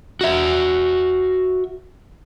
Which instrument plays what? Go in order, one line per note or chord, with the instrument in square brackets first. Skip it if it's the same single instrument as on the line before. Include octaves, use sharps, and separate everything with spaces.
[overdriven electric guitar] F#4 E5